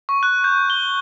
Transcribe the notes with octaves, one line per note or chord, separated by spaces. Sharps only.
C#6
F#6
G6
G7